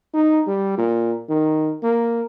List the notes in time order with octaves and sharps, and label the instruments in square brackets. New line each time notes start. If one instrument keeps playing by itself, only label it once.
[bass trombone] D#4
G3
A#2
D#3
A#3